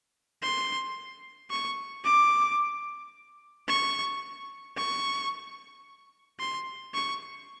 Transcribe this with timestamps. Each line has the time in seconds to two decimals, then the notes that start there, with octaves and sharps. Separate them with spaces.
0.42 C6
1.50 C#6
2.04 D6
3.68 C#6
4.77 C#6
6.40 C6
6.94 C#6